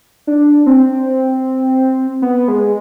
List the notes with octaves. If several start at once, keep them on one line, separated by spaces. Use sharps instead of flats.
D4
C4
B3
G#3